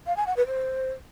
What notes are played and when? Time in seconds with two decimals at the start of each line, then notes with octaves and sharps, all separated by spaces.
0.06 F5
0.16 G#5
0.26 F#5
0.36 B4
0.46 C5